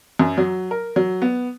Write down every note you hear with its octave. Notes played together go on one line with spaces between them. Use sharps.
F#2
F#3
A#4
F#3
B3